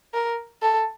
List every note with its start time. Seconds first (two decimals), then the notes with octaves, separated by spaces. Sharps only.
0.14 A#4
0.62 A4